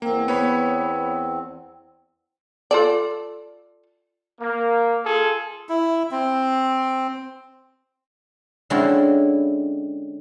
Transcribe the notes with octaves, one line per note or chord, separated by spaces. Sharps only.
E2 A#3 C4
B3 C#5 B5
F4 A4 D5
A#3
F4 G#4 A4
E4
C4
D3 G#3 C4 C#4 E4 F#4